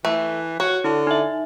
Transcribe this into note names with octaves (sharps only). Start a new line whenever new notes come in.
E3 A3
F#4 C#5
D3 E4
D#4 E5